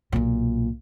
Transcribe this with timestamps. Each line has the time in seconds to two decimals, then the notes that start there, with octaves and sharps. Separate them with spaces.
0.12 B1 A#2